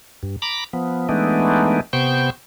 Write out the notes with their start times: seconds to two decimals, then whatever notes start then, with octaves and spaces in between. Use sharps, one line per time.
0.23 G2
0.42 A#5 B5 D6
0.73 F3 B3
1.09 E3 G#3 A3 B3 D4 D#4
1.93 C3 B3 C5 G5 C#6 G6